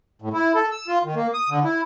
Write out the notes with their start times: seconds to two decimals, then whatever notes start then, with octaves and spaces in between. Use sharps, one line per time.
0.22 A2
0.34 E4
0.55 A4
0.71 E6
0.88 F4
1.04 D#3
1.16 A#3
1.34 D#6
1.50 D3
1.64 E4